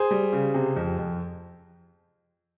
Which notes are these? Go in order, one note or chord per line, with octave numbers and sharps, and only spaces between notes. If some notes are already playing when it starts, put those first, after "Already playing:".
Already playing: G#4 C5
G3
C#3
C3
F2
F2